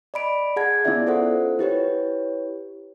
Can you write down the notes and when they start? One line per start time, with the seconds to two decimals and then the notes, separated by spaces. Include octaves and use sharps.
0.14 D5 D#5 B5 D7
0.56 G#4 F#5 A5 G#6
0.85 B3 C#4 E4 F4 D5 E5
1.07 F4 A4 C5 F#5
1.59 E4 G4 B4 C#5